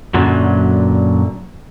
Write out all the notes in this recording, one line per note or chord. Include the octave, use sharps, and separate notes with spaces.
F#2 A#2 D3 F#3